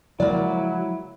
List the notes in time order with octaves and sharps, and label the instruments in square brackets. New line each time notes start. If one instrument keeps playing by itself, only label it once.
[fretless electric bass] C#3 F3 G#3 [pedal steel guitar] F#3 [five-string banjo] A#3 D5 [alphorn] E4